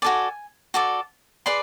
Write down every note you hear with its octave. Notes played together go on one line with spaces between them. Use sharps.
F#4 A4 D5 G#5
F#4 A4 D5
G#4 B4 D5 C6